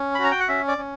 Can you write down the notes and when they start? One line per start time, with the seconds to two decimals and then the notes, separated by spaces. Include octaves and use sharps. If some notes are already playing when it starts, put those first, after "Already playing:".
Already playing: C#4
0.15 B5
0.19 F#4 A#5
0.31 G5
0.40 F#5
0.48 C#4 E5
0.68 D5
0.78 C#4